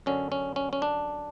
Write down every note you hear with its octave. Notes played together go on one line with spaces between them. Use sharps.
F#2 D3 C#4
C#4
C#4
C#4
D4